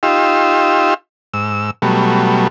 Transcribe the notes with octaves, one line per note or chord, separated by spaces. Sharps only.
D#4 F4 G4 C6 E6
G#2 E6
B2 F#3 G3 A3